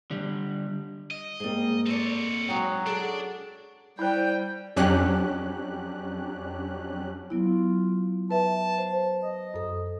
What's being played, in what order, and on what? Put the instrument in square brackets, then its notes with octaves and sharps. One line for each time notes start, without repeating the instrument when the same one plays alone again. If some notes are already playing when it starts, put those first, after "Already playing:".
[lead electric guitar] D3 G3
[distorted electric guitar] D#5
[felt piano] G#2 A#3 [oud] G3 G#4
[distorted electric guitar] C4 C#5 [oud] A4 B4 D5
[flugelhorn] F#3 [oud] G#3 D#4 F#4 [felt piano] G5
[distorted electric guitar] D4 [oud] G#4 A4
[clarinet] G3 [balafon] E4 C5 [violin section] G5
[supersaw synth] F2 F#3 C#4 D4 G4 F#6
[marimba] F#3 B3 E4 [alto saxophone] F4
[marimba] B4 E5 [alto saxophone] A5
[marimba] C5
[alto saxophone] D#5
[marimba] F#2 A4